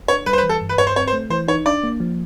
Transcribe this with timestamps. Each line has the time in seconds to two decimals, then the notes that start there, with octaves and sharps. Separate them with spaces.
0.08 D4 C#5
0.26 G3 B4
0.33 C5
0.38 B4
0.43 E3
0.49 A4
0.61 G2
0.69 B4
0.78 G2 C#5
0.87 C5
0.96 C4 C#5
1.07 C5
1.13 A3
1.30 E3 C5
1.48 D#4 C#5
1.66 D4 D5
1.83 A#3
2.00 F3